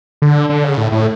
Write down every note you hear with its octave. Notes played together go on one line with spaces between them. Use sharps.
D3
D3
C#3
A2
A2